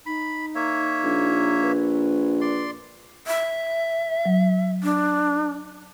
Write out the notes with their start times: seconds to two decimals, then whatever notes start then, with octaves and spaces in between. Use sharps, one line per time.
0.06 D#4 B5
0.55 A#3 C#5 E5
1.04 A#1
1.62 B4
2.41 D5 C6
3.27 E5
4.25 F#3
4.83 D4